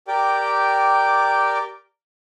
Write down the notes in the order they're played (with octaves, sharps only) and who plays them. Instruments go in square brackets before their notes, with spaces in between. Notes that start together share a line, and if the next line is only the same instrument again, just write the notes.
[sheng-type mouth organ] G4 A#4 D5 G5 D6